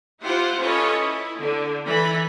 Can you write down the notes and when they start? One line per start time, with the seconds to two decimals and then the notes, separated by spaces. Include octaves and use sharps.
0.22 E4 F4 G4 C5 F#5
0.59 C#4 F4 A4 B4 C#5 D#5
0.97 E4
1.40 D3
1.84 E3 A4 B5